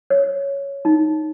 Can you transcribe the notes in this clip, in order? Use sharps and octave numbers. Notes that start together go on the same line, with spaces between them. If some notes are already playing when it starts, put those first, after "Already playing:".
C#5
D#4